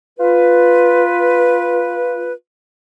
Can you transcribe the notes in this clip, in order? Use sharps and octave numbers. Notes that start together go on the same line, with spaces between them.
F4 B4